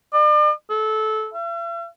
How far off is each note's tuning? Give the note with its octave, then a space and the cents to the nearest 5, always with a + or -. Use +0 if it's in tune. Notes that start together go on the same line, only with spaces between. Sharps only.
D5 +40
A4 -20
E5 +45